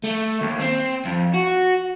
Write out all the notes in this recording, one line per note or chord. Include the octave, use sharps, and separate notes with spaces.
A3
D#2
C4
F2
F#4